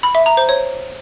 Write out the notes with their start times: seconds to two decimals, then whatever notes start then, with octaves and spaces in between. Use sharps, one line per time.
0.03 B5
0.15 E5
0.26 A#5
0.37 C5
0.49 C#5